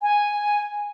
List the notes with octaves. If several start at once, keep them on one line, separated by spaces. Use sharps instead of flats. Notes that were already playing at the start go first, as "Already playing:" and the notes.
G#5